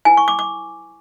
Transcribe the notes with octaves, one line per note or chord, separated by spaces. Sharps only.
E4 B4 G#5
C#6
D6
D6